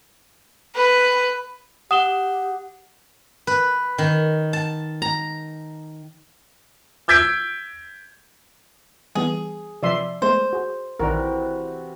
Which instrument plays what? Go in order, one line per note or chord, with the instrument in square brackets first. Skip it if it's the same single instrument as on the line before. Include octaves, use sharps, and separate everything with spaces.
[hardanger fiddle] B4
[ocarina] G4 [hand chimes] F#5 [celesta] D#6 E7 G7
[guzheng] B4
D#3
A5
A#5
[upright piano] E6 G6 G#6 B6 D7
[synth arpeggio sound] E3 G3 B3 [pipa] G#4
[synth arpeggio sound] C3 F3 B4 [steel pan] D5 E5 C6
[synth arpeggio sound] G#3 A3 B3 [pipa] C5
[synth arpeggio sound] F#4 G#4
[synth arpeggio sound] A#1 D#3 D5 [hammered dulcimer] C3 E3 F#4 [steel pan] A#4